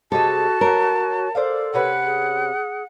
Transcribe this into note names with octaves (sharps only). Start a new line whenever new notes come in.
C3 G3 G#3 F#4 A4 A5
F#3 A#4
A4 C5 D5 F5
C3 C#4 B4 F#5
G#4